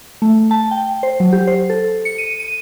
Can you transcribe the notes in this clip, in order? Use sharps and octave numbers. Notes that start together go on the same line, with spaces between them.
A3
A5
G5
C5
F#3
G4
C5
A4
C#7
D#7
D#7